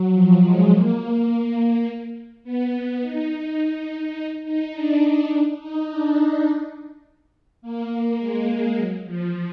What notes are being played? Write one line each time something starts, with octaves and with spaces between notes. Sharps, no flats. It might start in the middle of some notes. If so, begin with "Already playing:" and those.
Already playing: F#3
F3
G#3
A#3
B3
D#4
D#4
D#4
D4
D4
D#4
D4
A#3
G#3
F#3
F3